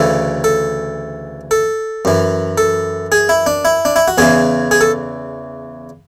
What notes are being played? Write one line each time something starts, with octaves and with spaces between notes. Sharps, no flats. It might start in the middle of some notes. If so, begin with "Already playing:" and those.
Already playing: D2 C#3 E3 A4
A4
A4
F#2 E3
A4
G#4
E4
D4
E4
D4
E4
F#4
E2 C#3 E3 G#4
G#4
A4